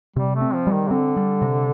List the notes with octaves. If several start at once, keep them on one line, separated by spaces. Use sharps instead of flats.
C3 G3
A3
C4
F3
G3
D#3
C3
D3 C4
G3
C3